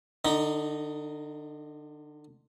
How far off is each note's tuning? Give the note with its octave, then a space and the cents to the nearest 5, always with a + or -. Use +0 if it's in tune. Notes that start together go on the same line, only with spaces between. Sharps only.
D3 +30 D#4 +0